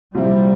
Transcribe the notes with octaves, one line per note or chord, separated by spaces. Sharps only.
C2 A#2 F3 G3 C4 E4